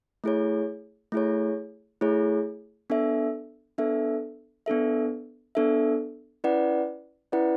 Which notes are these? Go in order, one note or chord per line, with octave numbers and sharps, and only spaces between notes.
A3 E4 G#4 C#5
A3 E4 G#4 C#5
A3 E4 G#4 C#5
B3 D4 A4 E5
B3 D4 A4 E5
B3 D4 A4 E5
B3 D4 A4 E5
C#4 E4 B4 D5 F#5
C#4 E4 B4 D5 F#5